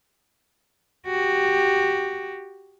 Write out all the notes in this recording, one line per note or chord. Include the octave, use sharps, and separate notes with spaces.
F#4 G4